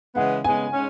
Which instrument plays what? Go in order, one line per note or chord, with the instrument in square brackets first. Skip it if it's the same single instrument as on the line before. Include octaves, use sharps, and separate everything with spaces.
[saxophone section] C#3 E3 G#3 B3 [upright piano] F#5
[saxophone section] C#3 G#3 B3 [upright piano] G#5
[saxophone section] G#3 C#4